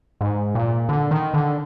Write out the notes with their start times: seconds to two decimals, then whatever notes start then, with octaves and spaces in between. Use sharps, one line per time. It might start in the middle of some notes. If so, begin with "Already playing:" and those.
0.21 G#2
0.55 A#2
0.89 D3
1.11 D#3
1.34 D3